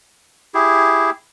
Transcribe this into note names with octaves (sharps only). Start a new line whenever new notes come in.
E4 G4 G#4